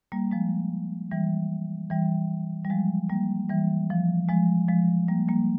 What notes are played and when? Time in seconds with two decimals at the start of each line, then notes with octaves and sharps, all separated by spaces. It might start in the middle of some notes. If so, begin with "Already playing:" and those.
0.12 G3 A#3
0.31 F3 G#3
1.12 E3 G3
1.90 E3 G3
2.65 G3
2.70 F3 G#3
3.09 G3 A#3
3.50 E3 G3
3.90 F3
4.29 F3 G#3
4.68 F3 G#3
5.08 G3 A#3
5.28 G3 A#3